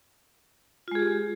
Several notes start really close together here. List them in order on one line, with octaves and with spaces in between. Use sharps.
F4 G#3 G#4 G4